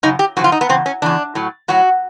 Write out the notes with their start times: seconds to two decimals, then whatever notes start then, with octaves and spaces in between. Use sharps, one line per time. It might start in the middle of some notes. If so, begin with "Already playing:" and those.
0.03 F#2 C#3 D#4
0.19 G4
0.37 F#2 C#3 F3 F#4
0.44 F4
0.52 D#4
0.61 B3
0.69 E2 C#3 C4
0.86 C#4
1.02 E2 C#3 E3 D4
1.35 A2 F#3
1.68 A2 F#3 F#4